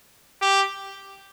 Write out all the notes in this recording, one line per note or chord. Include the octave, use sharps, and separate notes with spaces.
G4